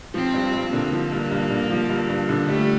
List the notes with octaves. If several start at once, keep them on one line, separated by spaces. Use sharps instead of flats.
F3 C4
G2
G2
D3 A#3
F3
G2
G2
D3
F3
G2
G2
D3
G3 A3